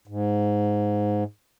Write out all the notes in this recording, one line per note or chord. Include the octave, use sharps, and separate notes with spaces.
G#2